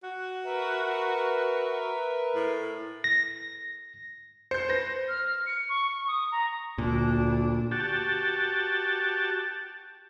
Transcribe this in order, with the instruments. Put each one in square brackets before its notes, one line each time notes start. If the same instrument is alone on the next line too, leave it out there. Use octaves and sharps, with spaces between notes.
[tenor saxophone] F#4
[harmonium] A#4 B4 E5
[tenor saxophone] A2
[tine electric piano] A#6
[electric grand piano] C5 [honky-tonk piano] G6 C#7
[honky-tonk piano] B4 A#6
[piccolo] F6
C#7
C#6
D#6
A#5
[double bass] D2 D4 [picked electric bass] A#2
[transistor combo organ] F#4 G4 A5